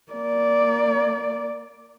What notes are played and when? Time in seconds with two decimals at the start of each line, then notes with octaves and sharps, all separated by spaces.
0.12 A#3 D5